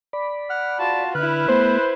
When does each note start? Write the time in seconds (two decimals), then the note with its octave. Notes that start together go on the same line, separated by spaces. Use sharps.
0.13 D5 B5
0.50 F#5 F6
0.80 F4 F#4 A5
1.15 D3 E4 B4 F6 F#6
1.48 A3 B3 C5